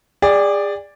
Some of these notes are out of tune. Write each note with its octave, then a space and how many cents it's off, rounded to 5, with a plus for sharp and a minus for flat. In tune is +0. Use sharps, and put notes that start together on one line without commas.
G#4 -30 D5 +0 G5 +0